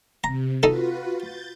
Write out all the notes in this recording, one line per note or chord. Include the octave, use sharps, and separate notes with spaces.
C3 A#5
D#4 F4 F#4 A4 B4
G6 A6